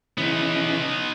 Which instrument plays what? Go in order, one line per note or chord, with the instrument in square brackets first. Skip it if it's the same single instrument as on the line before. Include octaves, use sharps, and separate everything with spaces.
[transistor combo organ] C#3 E3 [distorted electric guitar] B3 D#4